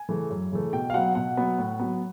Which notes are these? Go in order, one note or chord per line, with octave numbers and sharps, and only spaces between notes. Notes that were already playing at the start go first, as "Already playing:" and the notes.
Already playing: G#5
C#3 E3 A3
F#2
C#3 E3 A3
B2 G5
F5
F#3 B3 F#5
B2 F#5
F#3 B3
A2
F#3 B3